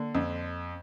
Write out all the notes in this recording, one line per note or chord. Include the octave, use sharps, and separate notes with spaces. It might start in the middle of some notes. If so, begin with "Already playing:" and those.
Already playing: D3 A#3
F2